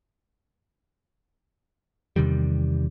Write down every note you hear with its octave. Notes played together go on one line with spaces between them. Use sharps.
E2 C3 D#3 G3